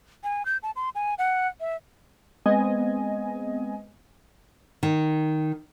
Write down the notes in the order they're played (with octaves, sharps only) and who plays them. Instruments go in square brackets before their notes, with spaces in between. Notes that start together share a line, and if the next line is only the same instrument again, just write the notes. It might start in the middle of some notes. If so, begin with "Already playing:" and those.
[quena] G#5
G6
A5
C6
G#5
F#5
E5
[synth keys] G#3 B3 C4 D#5 G#5
[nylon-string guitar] D#3